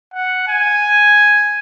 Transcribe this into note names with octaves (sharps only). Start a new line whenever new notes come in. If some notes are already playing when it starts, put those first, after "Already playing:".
F#5
G#5